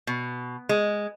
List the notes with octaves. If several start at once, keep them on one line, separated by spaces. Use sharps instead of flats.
B2
G#3